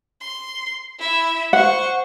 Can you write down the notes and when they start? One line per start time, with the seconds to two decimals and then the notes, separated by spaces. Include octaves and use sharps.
0.21 C6
0.99 E4 E5
1.53 C5 F#5 C#6